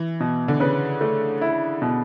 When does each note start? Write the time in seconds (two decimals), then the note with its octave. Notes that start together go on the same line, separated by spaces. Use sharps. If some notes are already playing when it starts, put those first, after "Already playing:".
Already playing: E3
0.20 B2
0.48 D3
0.60 C#3 B4
1.01 A3
1.41 E4
1.82 B2